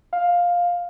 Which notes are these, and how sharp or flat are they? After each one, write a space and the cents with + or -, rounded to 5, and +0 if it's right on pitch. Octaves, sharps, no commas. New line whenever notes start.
F5 +10